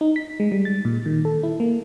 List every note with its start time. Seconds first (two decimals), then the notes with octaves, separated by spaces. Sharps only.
0.01 D#4
0.16 B6
0.40 G#3
0.52 G3
0.65 A6
0.85 A#2
1.06 D#3
1.25 A4
1.43 E4
1.60 A#3